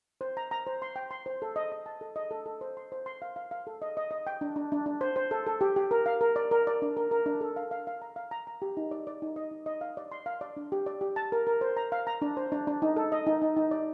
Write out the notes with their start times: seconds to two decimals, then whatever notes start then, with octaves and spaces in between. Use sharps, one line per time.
0.21 C5
0.37 A#5
0.51 A#5
0.66 C5
0.82 C6
0.96 G5
1.11 C6
1.26 C5
1.42 A4
1.56 D#5
1.72 D#5
1.86 A5
2.01 A4
2.16 D#5
2.31 A4
2.46 A4
2.61 C5
2.77 C6
2.92 C5
3.06 C6
3.22 F5
3.36 F5
3.51 F5
3.67 A4
3.82 D#5
3.97 D#5
4.11 D#5
4.27 G5
4.41 D4
4.56 D4
4.72 D4
4.86 D4
5.01 C5
5.16 C5
5.31 A4
5.46 A4
5.61 G4
5.76 G4
5.91 A#4
6.06 F5
6.21 A#4
6.36 D5
6.51 A#4
6.67 D5
6.82 D4
6.97 A#4
7.11 A#4
7.26 D4
7.41 A4
7.56 F5
7.71 F5
7.87 F5
8.02 A#5
8.16 F5
8.31 A#5
8.47 A#5
8.62 G4
8.77 D#4
8.91 D5
9.07 D5
9.22 D#4
9.36 D#5
9.51 D#4
9.66 D#5
9.81 F5
9.97 D5
10.12 C6
10.26 F5
10.41 D5
10.57 D4
10.72 G4
10.86 D5
11.01 G4
11.16 A5
11.32 A#4
11.47 A#4
11.61 C5
11.77 A#5
11.92 F5
12.07 A#5
12.22 D4
12.37 C5
12.52 D4
12.67 D4
12.82 D#4
12.96 A4
13.12 D#5
13.27 D#4
13.42 D#4
13.56 D#4
13.71 D5